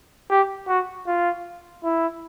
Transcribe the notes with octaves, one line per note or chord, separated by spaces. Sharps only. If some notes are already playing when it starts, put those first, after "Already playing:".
G4
F#4
F4
E4